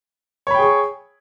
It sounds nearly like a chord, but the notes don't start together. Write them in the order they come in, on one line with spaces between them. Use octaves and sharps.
C#5 B5 G5 G#4 C#6